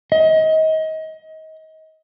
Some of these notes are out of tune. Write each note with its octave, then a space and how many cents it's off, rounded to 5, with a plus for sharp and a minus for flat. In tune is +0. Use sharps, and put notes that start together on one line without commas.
D#5 +30